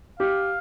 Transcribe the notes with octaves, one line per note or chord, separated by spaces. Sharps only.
G4 F5